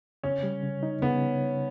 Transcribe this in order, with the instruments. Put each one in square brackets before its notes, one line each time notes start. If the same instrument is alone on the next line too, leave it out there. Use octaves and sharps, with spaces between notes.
[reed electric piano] C#3 [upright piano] C#4
[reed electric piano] G3
C#3
D#4
[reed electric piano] C#3 [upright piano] B3